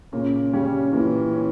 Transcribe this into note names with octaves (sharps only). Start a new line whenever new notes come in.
A#2 C#3
C#3 G3 C#4
A#2 E3
C#4